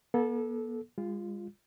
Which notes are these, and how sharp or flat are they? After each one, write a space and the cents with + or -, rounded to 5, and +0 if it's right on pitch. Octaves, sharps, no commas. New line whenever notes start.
B3 -45 A4 -15
G#3 -40 F4 +0